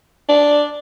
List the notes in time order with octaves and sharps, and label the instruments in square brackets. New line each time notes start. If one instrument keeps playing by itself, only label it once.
[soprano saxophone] D4